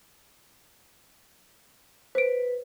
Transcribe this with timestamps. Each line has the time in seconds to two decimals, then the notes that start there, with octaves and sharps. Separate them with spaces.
2.15 B4 C5 D7